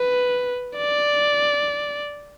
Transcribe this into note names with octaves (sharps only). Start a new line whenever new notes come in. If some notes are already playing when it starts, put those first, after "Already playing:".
Already playing: B4
D5